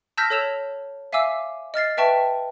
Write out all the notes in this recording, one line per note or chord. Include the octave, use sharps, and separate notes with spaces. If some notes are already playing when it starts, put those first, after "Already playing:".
A5 E6 F6 G6 A#6 B6
A4 C#5 E6 E7 F7
E5 F5 G#5 D6 E6
D#5 F6 A6 C7
B4 E5 G5 A5 C#6